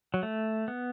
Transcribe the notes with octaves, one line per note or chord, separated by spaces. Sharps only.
F#3
A3
B3